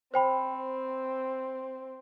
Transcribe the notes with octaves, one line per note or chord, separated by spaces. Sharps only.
C4 C5 G5 B5